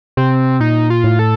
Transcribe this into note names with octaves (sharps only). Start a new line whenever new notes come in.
C3 C4
A#2 D#4
F4
A2
A4